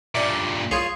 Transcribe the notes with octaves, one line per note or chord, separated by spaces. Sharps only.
G2 A#2 D5 E5 D6
C2 F4 G#4 C#5 D#6 G#6 C7